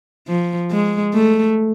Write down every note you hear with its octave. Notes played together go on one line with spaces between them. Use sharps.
F3
G#3
A3